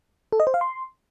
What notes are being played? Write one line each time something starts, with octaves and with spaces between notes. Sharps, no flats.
A4
D#5
C5
F5
C6